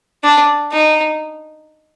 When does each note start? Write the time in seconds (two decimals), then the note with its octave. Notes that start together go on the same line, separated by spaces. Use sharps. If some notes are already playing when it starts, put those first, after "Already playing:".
0.24 D4
0.72 D#4